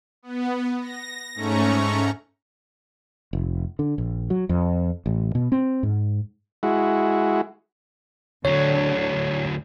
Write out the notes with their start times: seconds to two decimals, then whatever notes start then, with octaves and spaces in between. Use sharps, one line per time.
0.23 B3
0.81 A#6
1.35 G#2 A3 C#4 A#5 C#6
3.33 F1
3.79 D3
3.98 A#1
4.30 F#3
4.49 F2
5.06 A1
5.35 B2
5.52 C4
5.83 G#2
6.63 G#3 E4 F#4
8.45 D2 D3 F#3 C#5